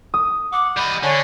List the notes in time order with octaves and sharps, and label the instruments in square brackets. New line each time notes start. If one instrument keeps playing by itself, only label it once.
[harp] D#6
[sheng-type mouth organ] F#5 [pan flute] D6
[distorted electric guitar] G3 D#5 [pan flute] B5
[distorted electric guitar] D3 [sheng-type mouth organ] C#5 G#5 A5 [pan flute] D5